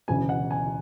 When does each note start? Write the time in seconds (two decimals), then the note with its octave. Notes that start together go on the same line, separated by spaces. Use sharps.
0.08 E1 D2 C#3 G#5
0.29 F#5
0.51 G#5